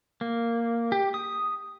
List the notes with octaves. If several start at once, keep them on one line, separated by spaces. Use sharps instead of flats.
A#3
G4
D#6